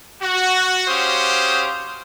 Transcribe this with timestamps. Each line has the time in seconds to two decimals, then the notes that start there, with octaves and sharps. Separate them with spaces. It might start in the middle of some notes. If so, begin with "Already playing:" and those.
0.21 F#4
0.88 C#4 F#4 G4 C5 F5 D#6